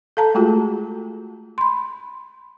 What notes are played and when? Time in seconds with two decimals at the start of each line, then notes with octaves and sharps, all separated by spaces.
0.17 A4 F5 A5 A#5
0.34 G#3 A3 F4 F#4 G#4
1.58 B5 C6